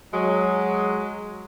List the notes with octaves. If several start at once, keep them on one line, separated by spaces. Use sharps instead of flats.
F#3 G#3